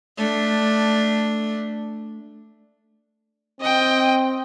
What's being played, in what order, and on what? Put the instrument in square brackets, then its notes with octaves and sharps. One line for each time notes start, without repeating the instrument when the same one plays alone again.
[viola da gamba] A3 D4
[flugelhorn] C4 [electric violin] D#5 G5